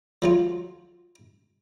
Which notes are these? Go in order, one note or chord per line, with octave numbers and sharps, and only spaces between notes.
F3 F#3 F4